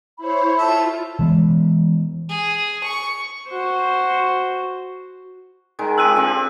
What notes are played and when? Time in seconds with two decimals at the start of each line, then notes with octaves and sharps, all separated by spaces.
0.18 E4 C5 C#5 B5
0.58 F4 A4 E5
1.19 E3 G#3 B3
2.30 G#4
2.84 C#6
3.49 F#4 C5
5.79 D#3 G#3
5.98 F3 C4 G4 E6 F#6 D#7
6.16 D3 C4 G4